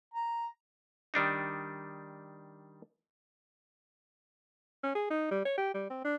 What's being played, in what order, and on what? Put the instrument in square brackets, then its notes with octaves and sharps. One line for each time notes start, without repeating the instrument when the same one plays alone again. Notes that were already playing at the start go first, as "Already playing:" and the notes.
[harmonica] A#5
[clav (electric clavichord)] D#3 G3 D4 D#4
[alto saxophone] C#4
G#4
D#4
G3
C#5
G4
G3
C4
D4